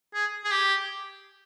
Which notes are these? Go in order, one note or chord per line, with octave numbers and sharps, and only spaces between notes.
G#4
G#4
G4